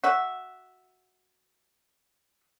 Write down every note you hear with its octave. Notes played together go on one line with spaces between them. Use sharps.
F#4 E5